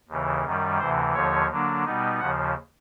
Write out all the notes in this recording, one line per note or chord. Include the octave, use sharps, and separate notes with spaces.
D#2 C#3 E3
F#2 D#3 G3
D2 C3 E3 C5
D#2 D3 F3 C#5
D3 F#3 A#3 D4
B2 G3 B3 D#4
D#2 C#3 F3 F#5